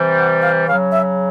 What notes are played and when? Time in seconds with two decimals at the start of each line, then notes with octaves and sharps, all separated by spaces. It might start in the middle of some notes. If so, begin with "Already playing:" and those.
Already playing: C3 E3 G3
0.19 F#5
0.42 F5
0.67 C#3 F#3 F5
0.92 E5